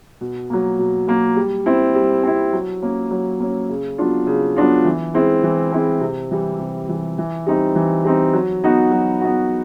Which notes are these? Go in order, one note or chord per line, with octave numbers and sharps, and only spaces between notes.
B2
F#3 A#3
B2
F#3 A#3
G3
C4 E4
G3
C4 E4
F#3
A#3 C#4
F#3
A#3 C#4
C#3
F#3 B3 D4 F4
C#3
F#3 B3 D4 F4
E3
G#3 C4 E4
E3
G#3 C4 E4
C3
E3 G3
C3
E3 G3
E3
G3 C4 D#4
E3
G3 C4 D#4
F#3
B3 D#4 F#4
F#3
B3 D#4 F#4